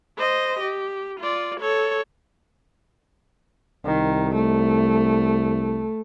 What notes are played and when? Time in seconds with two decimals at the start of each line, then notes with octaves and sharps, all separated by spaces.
0.18 C5 D#5
0.60 G4
1.20 F4 D5
1.60 A4 C#5
3.86 C2 D#3
4.35 A3